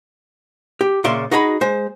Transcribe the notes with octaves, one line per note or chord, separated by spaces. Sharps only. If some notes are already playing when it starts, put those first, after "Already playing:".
G4
A#2 C#3 D5 E5 C6
D#4 F#4 G#4 D#5 F#5 B5
G#3 C5